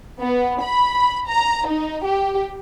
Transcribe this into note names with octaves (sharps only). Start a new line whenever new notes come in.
B3
B5
A#5
D#4
G4